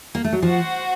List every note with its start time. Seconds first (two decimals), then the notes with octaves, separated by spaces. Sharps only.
0.15 A#3
0.24 A3
0.32 F#3
0.41 F3 F#4 C5 F#5